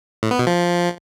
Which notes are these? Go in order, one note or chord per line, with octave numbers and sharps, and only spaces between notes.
A2
B3
B2
F3